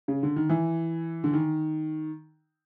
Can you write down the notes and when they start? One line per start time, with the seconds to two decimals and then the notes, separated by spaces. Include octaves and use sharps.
0.08 C#3
0.23 D3
0.36 D#3
0.49 E3
1.24 D3
1.33 D#3